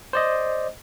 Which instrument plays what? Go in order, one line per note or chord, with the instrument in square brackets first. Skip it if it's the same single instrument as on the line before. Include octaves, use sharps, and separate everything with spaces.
[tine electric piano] C5 D5 D#5